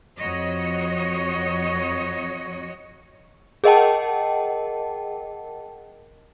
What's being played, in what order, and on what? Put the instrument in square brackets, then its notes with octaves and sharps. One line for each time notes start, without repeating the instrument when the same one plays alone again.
[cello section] F2 F#4 C#5 D#5
[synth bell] G#4 A#4 D#5 F#5 G5 A5